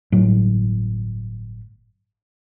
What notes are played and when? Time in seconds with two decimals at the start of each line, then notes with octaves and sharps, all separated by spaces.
0.12 G1 A2 F#3